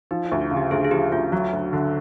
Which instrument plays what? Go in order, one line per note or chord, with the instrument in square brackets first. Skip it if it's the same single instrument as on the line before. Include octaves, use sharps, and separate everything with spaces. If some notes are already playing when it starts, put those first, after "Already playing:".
[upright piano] F3 [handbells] D#4
[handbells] E4
[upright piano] D2
[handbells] F4
[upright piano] C#3
[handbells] G4
[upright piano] D2 [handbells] G#4
[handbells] G#4
[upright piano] F3 [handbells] G4
[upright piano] D2 [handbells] F4
[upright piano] F#3 [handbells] F#4
[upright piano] D2
D3